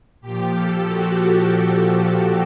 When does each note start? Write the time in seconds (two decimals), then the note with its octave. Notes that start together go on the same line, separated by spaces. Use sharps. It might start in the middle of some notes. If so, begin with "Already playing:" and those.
0.21 A#2 G4
0.26 F3
0.52 A4
0.85 F#4